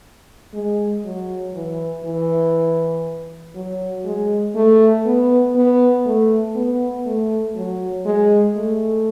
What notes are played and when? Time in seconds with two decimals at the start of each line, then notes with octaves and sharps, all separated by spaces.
0.54 G#3
1.05 F#3
1.55 E3
2.04 E3
3.55 F#3
4.05 G#3
4.55 A3
5.06 B3
5.55 B3
6.06 A3
6.55 B3
7.06 A3
7.56 F#3
8.06 G#3
8.56 A3